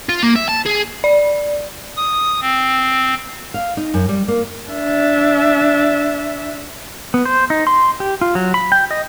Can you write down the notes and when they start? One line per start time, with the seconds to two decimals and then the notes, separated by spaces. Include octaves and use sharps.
0.09 F4
0.23 A#3
0.36 E5
0.49 A5
0.66 G#4
1.04 D5
1.97 D#6
2.41 C4
3.54 F5
3.77 D#4
3.94 F#2
4.09 G3
4.28 A#3
4.69 D4 E5
7.14 B3
7.25 C5
7.50 D#4
7.67 C6
8.00 G4
8.21 F4
8.35 F#3
8.54 B5
8.72 G5
8.91 D#5